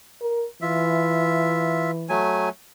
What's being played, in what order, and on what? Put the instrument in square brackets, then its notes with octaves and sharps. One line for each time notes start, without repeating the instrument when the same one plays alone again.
[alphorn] A#4
[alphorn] E3 [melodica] F4 E5
[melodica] F#3 A3 G#5